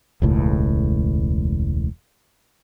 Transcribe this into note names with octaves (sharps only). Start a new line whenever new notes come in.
E1 C#2 A2